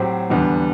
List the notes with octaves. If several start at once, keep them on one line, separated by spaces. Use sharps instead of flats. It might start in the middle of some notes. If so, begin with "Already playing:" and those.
Already playing: A2 F#3 C4 G4 C5
E2 D3 G3 B3